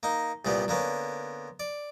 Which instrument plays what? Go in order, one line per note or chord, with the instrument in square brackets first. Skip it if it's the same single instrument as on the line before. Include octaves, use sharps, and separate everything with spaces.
[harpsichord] A#3 D#4
C2 A#2 G3 B3
D3 A#3 B3 C#4
D5